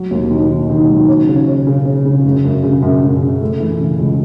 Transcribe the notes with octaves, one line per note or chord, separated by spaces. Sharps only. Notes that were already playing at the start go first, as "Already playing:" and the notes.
Already playing: F#3
D#2
D#3
D#3
D#3
F#3
C#4
C#3
C#4
C#3
C#4
C#3
F#2
F#2
C#3
F#2
F#2
C#3
A3
E3
C#3
C#2